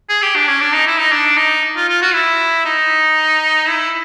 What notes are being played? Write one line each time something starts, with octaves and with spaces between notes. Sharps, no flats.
G#4
G4
D4
C#4
D4
D#4
E4
D#4
D4
D#4
F4
F4
F#4
E4
D#4
E4